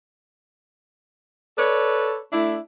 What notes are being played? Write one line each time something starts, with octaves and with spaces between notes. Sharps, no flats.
A4 B4 C#5 D5
A3 D4 E4